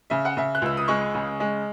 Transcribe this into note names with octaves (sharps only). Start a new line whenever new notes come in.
C#3 E5
F#5
C#3 E5
F#6
C#2 E6
D#6
G#3 C#6
C#3
G#3